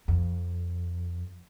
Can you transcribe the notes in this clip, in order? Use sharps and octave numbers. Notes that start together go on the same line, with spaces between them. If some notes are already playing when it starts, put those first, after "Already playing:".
F2